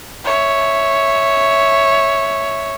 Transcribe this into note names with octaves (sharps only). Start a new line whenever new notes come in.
C#5 E5